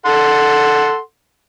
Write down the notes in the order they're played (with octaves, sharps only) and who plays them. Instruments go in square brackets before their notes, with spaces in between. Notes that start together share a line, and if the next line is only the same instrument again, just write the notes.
[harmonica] A4 F#5 C6